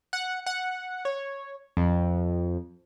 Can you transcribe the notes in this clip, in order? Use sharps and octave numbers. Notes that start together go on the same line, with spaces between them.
F#5
F#5
C#5
F2